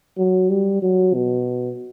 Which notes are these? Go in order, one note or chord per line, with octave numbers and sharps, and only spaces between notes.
F#3
G3
F#3
B2